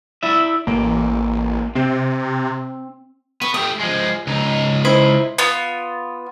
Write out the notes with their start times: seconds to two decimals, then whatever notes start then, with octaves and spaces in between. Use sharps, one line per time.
0.23 E4 D5 E5
0.67 A1 A#3
1.75 C3 C4
3.42 B3 C#6
3.54 A3 G4 D#6
3.80 F3 G#3
4.27 C#2 D#4
4.85 E4 C5 D#5
5.38 B3 F4